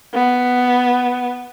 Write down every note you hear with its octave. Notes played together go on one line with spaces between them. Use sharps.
B3